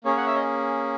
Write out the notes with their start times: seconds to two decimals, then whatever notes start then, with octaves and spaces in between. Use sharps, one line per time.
0.04 A#3 C#4 G#4 C#5
0.17 F#5
0.27 E5
0.35 D#5